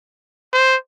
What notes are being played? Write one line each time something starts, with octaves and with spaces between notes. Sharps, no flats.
C5